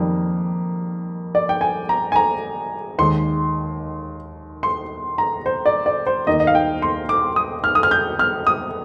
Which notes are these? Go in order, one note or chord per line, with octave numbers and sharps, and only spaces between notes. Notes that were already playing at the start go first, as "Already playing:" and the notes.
Already playing: F2 D#3 G3 A#3
D5
G5
G#5
A#5
G#5
A#5
D#2 D#3 G#3 C6
C6
A#5
C5
D5
D5
C5
D#2 D#3 A#3 D#5
D#5
F5
G5
C6
D6
D#6
F6
D#6
F6
G6
F6
D#6